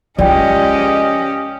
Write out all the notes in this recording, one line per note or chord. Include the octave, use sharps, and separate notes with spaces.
C#2 F3 C#4 F4 G4 D5 D#5 G5